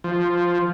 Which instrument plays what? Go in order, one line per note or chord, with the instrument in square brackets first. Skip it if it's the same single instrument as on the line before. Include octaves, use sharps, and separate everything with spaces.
[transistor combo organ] F3